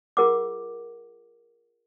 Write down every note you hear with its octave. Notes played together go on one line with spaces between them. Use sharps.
F4 G#4 A#4 F#5 D6